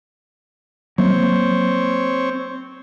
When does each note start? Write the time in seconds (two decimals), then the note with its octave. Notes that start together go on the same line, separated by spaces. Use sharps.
0.98 F#3 A#3 C4 C#5